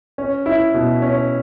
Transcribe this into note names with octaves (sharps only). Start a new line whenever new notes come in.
C#4
E4
B2
C#4